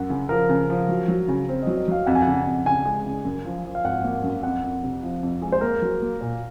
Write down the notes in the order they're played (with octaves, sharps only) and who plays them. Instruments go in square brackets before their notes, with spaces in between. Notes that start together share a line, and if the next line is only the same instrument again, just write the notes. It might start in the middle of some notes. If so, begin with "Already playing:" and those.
Already playing: [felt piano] F#2 [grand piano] F#5
[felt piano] C#3
[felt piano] F3 [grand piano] A#4
[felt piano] C#3
F3
F#3
F#3
C#3
C4
[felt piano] F#3 [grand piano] D#5
[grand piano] D#5
[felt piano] F#3 [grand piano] F5
[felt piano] F2 [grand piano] F#5
[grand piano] G#5
[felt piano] C#3 [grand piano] F#5
[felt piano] F2
[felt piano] C#3 [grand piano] G#5
[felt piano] G#3
C#3
F#2
F3
F3
[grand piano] F5
[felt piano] G#1 [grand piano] F#5
[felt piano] A#3
F#2
[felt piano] F2 [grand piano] F#5
[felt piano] F2
C3
F3
F2
G#3
[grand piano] C5
[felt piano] A#3 [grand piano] A#4
[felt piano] F#3
A#3
A#2